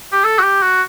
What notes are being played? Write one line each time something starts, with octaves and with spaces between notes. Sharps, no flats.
G4
A4
F#4
G4
F#4